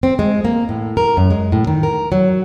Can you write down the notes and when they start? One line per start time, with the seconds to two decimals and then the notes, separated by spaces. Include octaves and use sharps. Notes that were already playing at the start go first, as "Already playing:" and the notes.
0.03 C4
0.19 G#3
0.45 A#3
0.69 A2
0.97 A#4
1.17 F#2
1.31 G#3
1.52 A2
1.67 D#3
1.83 A#4
2.12 F#3